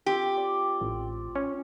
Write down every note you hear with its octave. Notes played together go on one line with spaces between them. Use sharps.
C4 F4 G4
D5
A1
C#4